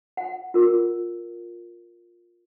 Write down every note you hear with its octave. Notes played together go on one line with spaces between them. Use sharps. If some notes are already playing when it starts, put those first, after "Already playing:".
F#5
F4 A#4